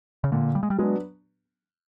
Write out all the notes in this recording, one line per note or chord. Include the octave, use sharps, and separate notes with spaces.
C#3
A#2 D3
G3
G#3
G3
F#3 G#3 B3 D4